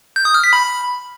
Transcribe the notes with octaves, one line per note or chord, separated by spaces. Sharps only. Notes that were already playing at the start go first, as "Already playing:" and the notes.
G6
D#6
F6
B6
B5